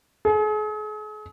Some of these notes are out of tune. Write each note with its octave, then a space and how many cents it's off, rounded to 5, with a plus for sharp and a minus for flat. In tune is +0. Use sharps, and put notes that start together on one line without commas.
G#4 +40